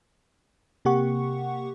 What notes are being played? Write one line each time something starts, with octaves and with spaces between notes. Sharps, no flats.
C3 A#3 G4 F#5 C#6